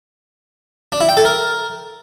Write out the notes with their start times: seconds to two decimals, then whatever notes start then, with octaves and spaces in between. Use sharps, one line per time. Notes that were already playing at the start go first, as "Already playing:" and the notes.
0.92 D4
1.01 E4
1.09 G5
1.17 A4
1.25 A#4